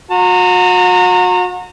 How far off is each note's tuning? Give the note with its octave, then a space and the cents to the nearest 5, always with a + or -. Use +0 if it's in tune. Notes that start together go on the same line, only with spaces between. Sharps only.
F#4 -40 A#5 -30